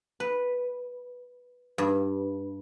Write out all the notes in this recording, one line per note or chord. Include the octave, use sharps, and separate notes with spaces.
B4
G2